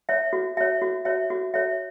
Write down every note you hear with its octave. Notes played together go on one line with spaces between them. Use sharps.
C#5 E5
F#4
C#5 E5
F#4
C#5 E5
F#4
C#5 E5